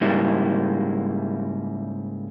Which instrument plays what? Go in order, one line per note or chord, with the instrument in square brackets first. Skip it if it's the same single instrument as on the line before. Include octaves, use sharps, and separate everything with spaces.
[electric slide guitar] G#2 C#3 G3 A#3 E4